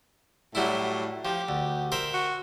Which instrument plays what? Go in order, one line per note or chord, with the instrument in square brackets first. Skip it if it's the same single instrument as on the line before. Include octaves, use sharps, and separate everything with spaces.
[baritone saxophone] A2 [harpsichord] F#3 G3 E4
[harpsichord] F3 [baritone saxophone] G4
[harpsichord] D2
A#4 C5 E5
[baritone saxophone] F#4